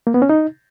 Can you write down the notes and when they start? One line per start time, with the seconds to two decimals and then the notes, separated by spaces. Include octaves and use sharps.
0.07 A#3
0.14 B3
0.22 C#4
0.29 D#4